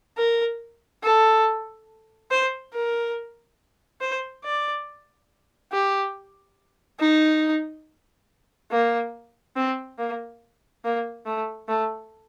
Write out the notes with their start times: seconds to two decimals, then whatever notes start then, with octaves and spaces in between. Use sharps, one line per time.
0.17 A#4
1.03 A4
2.31 C5
2.73 A#4
4.01 C5
4.44 D5
5.72 G4
7.00 D#4
8.71 A#3
9.56 C4
9.98 A#3
10.84 A#3
11.26 A3
11.69 A3